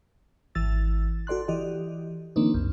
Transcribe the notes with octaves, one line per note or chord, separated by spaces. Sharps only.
G#1 E3 E6 A6
F#4 A4 D5 C6 F#6
E3 G4 D5 D#5
D#3 F3 A#3 C4 D4 D#4
C2 F#2